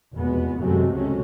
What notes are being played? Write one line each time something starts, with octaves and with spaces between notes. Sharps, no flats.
F1 E2 B2 G#3 B3
F#2 C3 D#3 F#3 G#3 A3
C#2 C3 F#3 G#3 A3 C#4